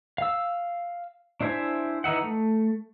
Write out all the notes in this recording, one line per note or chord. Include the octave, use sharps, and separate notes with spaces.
F5 E6
D4 E4 C5 E5 G#5
E3 D#4 E5 F#5
A3